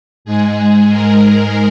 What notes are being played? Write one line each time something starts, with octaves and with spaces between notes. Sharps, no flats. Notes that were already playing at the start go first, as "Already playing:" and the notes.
G#2 G#3 G#4
A#4